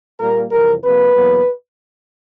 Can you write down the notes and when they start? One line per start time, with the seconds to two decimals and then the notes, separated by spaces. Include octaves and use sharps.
0.19 A#2 G3 A#3 A#4
0.51 F2 C3 E3 G3 A#4
0.83 C3 F3 A#3 B4
1.15 E2 B2 F#3 A#3